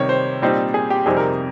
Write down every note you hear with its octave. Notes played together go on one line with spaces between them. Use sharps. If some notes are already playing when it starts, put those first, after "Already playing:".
Already playing: C3 D#3 G3 C#5
C5
A#2 G3 C4 D#4
G#4
G4
F2 C3 G3 C4 D#4 G#4
A#4